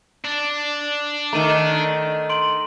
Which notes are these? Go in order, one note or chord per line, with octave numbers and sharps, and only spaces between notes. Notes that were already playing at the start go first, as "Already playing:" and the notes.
D4
D#3 A3 A#5 D#7
C6 D7 F#7